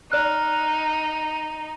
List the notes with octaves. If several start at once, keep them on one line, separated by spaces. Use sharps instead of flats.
D#4 D5 F6 F#6